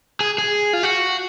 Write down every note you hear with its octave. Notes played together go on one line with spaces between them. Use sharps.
G#4
G#4
F4
F#4